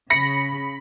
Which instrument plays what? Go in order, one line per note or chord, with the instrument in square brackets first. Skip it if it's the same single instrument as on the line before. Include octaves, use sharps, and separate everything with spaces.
[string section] C#3 [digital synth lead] B5 [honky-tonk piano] A#6 C#7